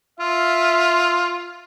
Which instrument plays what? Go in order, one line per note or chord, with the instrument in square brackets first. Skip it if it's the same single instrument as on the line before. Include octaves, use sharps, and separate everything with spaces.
[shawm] F4 [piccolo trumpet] E5